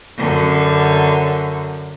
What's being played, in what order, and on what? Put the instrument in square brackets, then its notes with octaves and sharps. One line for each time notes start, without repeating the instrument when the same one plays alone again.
[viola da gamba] F#2 D3